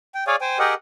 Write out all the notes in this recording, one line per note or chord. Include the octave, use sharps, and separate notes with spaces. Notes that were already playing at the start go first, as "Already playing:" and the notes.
G5
G#4 C#5 D5 F5 G#5
C5 G5 G#5
G4 G#4 A#4 D#5 F#5 G5